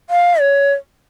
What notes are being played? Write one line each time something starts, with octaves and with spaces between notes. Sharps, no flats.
F5
C#5